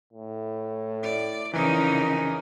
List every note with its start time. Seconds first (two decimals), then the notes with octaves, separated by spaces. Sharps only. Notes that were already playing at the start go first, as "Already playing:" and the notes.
0.13 A2
1.03 D5
1.53 F2 C#3 E3 D#4 A#4